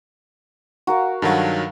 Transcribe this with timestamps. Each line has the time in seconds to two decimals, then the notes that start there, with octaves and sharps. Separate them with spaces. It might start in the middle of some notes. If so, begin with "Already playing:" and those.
0.87 F#4 A#4 F5
1.22 G2 D#3 F#3 A4 F5 F#5